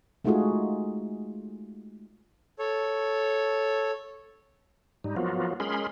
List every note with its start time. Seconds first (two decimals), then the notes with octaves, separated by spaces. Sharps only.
0.25 G#3 A3 D#4 F4 F#4 G#4
2.59 A4 C#5
5.04 G#2 G3 D#4
5.16 F3 F#3 A#3 B3 F4 F#4
5.60 G#3 C#4 G#4 A#4 B5 C6